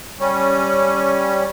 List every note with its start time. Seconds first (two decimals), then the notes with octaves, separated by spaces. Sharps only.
0.20 G3 C#4